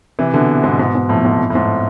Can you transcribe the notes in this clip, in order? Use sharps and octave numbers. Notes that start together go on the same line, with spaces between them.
C3 E3
B2 D3
G#2 B2
G#2 B2
G#2 B2
F2 A2
G#2
F2
A2
G#2